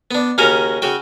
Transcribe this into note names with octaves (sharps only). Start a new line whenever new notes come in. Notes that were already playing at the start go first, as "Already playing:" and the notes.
B3 D4
D#2 C#3 C#4 F#4 A#4 A#5
C#3 F#4 G5